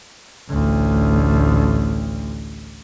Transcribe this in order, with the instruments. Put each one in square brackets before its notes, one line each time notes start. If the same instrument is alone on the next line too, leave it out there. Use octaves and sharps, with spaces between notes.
[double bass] A1 D2